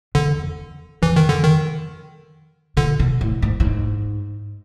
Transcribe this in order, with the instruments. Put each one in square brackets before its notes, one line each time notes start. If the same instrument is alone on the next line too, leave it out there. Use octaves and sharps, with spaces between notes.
[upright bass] E2 [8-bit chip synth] D3
[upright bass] F2 [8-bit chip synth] E3
[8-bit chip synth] D#3
D3
D#3
[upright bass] A#2 [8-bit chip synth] D3
[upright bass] B2
A2
G#2
A2
G#2